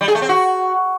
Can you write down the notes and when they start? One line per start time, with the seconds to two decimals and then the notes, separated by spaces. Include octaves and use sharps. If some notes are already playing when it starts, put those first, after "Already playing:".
0.01 G3
0.08 G#4
0.15 A3
0.22 C4
0.29 F#4